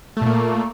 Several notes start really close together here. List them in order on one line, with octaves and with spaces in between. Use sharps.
A3 A#2 A#3